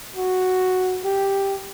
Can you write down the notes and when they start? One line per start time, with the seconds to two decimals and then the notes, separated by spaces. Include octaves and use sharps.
0.16 F#4
1.05 G4